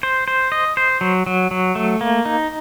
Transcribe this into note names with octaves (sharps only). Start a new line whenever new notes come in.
C5
C5
D#5
C5
F#3
F#3
F#3
A3
A#3
D#4